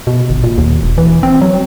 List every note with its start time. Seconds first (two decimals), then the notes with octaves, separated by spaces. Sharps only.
0.07 B2
0.30 G1
0.44 A#2
0.58 D#2
0.83 E1
0.98 E3
1.23 C4
1.41 F#3